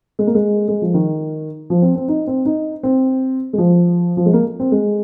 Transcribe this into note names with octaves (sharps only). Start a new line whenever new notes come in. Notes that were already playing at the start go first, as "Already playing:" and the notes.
G#3
A#3
G#3
G#3
F3
D#3
F3
C4
C4
D#4
C4
D#4
C4
G#3
F3
F3
G#3
A#3
C4
G#3